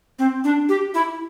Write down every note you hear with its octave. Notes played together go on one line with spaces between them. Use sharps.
C4
D4
G4
E4